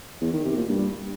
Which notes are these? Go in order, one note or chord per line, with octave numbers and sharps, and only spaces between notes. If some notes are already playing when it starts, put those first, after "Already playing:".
E2
D#3
C3
A#2
G2